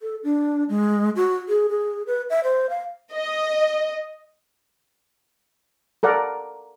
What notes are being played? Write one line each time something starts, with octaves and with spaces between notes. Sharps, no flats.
A4
D4
G#3
F#4
G#4
G#4
B4
E5
C5
F5
D#5
A4 A#4 D5 F#5